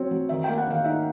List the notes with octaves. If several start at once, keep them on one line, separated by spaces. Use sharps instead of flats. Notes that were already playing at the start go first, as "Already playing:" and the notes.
Already playing: F#3 C4 C#5
F#3
D#3 E5
A#3 G5
F#5
D#3 F5
D#4 E5